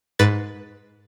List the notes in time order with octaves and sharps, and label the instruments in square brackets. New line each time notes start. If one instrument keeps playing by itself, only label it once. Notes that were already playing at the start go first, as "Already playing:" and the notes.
[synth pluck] G#2 B4 A6